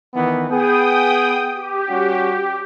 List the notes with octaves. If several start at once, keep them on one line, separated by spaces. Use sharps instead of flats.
D#3 E3 B3
B3 G#4 G5 D#6
G4
G3 C#4 F#4